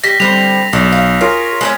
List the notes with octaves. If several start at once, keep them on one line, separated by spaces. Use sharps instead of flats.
G3 A#6 B6
D3 G3 C4 F7
B1 A3 D4
F5
F4 G#4 A#4 C#5
G#3 C4 C#4